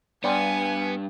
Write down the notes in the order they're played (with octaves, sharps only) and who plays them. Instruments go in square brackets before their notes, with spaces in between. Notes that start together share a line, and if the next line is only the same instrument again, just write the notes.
[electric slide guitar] G2 [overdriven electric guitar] B3 [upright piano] D5 G5 C6 [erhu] G#5